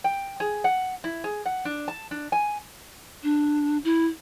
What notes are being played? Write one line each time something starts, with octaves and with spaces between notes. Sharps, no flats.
G5
G#4
F#5
E4
G#4
F#5
D4
A5
D4
G#5
D4
E4